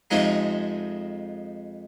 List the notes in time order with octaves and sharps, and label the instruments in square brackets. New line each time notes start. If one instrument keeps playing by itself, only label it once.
[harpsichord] F2 C3 F3 G#3 D#4